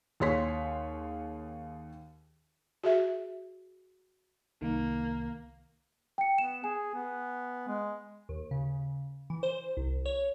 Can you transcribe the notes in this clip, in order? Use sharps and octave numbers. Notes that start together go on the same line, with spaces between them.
D#2 G#4 C#5 C6 B6
F#4 G#4 E5
C2 D#3 A#3
G5 C#7
B3 E7
G#4 G#5
B3
G#3
D#2
C#3
E3
C5
C2
C#5